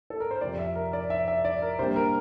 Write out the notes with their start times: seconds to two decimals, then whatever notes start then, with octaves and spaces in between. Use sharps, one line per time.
0.10 A4
0.20 A#4
0.31 C5
0.41 F2 C3 F3 C4 D5
0.59 E5
0.76 A#4
0.93 D5
1.10 E5
1.28 E5
1.45 D5
1.62 A#4
1.79 C3 G3 A#3 D4 C5
1.96 A#4